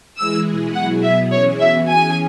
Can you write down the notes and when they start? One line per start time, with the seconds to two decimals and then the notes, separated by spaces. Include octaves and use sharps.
0.18 E3 G#3 E4 G#4 E6
0.46 B2 G#3 E4 G#4
0.75 B2 F#3 E4 G#4 F#5
1.03 B2 F#3 B3 E5
1.32 E3 C#4 E4 G#4 C#5
1.60 E3 B3 F#4 E5
1.88 E3 C#4 G#4 G#5